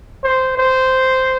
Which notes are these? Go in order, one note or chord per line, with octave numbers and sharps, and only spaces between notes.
C5
C5